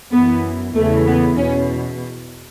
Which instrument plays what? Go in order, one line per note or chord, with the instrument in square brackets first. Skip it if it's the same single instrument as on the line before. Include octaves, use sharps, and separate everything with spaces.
[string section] F#2 E3 B3
E2 C#3 E3 A3
B3
E2 B2 C#4